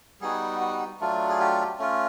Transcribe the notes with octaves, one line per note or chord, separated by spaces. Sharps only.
G3 B3 D#4 F#4 G#4
F#4
F#3 A3 D4 F4
G#4
G4
A3 C#4 F4